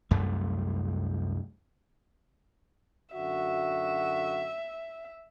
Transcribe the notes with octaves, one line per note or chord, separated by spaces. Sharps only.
C2 F#2 A3
F#2 D3 F#4 E5